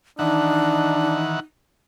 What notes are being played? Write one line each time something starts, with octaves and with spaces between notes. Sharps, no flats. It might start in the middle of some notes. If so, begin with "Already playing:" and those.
D#3 E3 D4 D#4 F#5